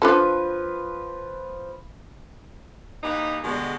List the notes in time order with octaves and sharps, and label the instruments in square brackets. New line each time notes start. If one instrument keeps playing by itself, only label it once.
[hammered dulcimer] F3 B4 [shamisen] D4 F4 A4
[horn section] E3 A#3 D#4 G4 B4
B2 D3 G3 G#3